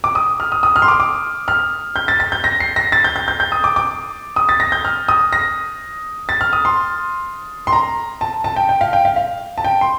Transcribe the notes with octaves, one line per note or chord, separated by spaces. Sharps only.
D6
D#6
F6
D#6
D#6
F6
C6
D6
D6
F6
G6
A6
A6
G6
A#6
C7
A#6
A6
G6
G6
G6
G6
D#6
D6
D6
D#6
A6
A#6
G6
F6
D#6
A#6
A6
F6
D#6
C6
C6
A#5
A5
A5
G5
G5
F5
G5
F5
F5
A5
G5
C6